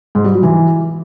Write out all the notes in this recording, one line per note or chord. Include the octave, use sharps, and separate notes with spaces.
G#2
G3
F#3
E3